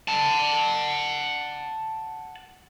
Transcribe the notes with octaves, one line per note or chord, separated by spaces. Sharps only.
F#5 A5